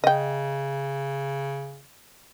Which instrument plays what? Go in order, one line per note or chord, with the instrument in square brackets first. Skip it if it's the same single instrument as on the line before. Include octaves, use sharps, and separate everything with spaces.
[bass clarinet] C#3 [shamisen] D#5 G5